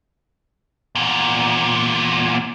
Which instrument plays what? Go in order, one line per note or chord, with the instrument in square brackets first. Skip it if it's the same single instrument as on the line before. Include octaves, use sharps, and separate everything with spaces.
[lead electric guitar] E2 A#2